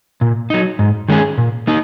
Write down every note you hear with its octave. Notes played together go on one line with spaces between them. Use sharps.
A#2
F#3 D#4
G#2
D#3 G#3 C#4 G#4
A#2
A#3 D#4